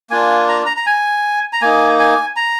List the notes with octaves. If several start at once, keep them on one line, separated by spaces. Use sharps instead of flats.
A#3 D4 F4 G#5
A#5
A#5
A#5
G#5
A#5
A#3 D#4 G#5
G#5
A#5